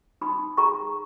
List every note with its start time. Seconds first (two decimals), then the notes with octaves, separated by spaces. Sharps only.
0.21 D#4 B5 D#6
0.57 G#4 A#5 C#6